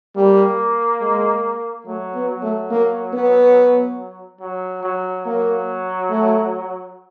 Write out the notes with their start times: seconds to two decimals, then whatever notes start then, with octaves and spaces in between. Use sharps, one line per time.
0.16 G3 A#3
1.01 G#3
1.86 F#3 A3
2.14 B3
2.29 F#3
2.42 A3
2.71 A#3
3.13 B3
4.40 F#3
4.83 F#3
5.25 F#3 A#3
6.10 A3